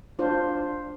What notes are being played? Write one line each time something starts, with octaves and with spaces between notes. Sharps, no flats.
D4 F4 C5